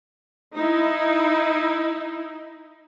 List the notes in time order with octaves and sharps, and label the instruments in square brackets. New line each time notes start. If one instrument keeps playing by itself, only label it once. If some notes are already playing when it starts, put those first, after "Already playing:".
[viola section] D#4 E4